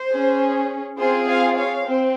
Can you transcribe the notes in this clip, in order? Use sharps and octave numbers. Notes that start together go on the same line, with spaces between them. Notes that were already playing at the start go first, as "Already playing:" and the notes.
Already playing: C5
C#4 G#4
C4 F4 G#4 C5
F5 G#5
C#5 F5
C4 C5